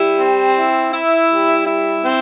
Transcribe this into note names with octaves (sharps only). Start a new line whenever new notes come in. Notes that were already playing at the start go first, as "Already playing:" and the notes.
Already playing: G3 E4
C4
E4
E4
G3
E4
C4